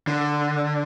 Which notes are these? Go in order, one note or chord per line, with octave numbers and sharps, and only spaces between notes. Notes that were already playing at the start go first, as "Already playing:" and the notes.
D3